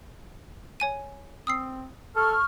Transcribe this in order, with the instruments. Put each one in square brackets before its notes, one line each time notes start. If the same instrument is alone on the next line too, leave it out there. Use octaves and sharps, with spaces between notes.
[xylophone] C#5 G#5 D#7
[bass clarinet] C4 [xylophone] D#6 E6 C7
[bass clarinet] A4 [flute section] C#6 F6